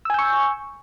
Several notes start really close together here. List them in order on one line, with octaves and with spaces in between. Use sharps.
E6 G#5 G6 C#6